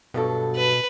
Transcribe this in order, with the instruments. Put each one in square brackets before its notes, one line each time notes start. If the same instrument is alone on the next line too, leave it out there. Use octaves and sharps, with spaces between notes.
[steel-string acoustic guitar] G2 F#3 A4 [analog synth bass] B2
[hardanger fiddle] B4